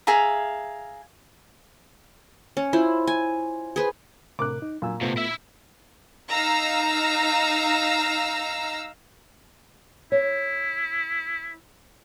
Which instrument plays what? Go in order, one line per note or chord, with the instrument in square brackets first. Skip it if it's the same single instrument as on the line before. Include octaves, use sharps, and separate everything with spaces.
[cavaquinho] G#4 E5 F5 A#5
[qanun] C#4
E4 F4 C5
G#5
G#4 B4 C5
[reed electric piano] A2 C3 A#4 [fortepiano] D6 F#6
[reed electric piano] D#4
[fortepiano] A#2 [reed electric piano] F#3 G#5 E6
[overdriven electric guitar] A2 C3 [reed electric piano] A3 B3 F4
[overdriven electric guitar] E4 E5
[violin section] D#4 F5 A#5 E6
[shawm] E4 [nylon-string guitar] C#5